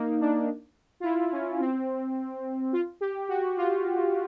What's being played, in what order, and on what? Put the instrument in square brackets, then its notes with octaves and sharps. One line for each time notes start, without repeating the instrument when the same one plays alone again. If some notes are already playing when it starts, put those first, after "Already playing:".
Already playing: [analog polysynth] A#3 D#4
D4
F4
E4
C#4
C4
F4
G4
F#4
F4